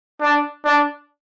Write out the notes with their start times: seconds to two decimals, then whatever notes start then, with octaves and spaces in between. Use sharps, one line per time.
0.21 D4
0.64 D4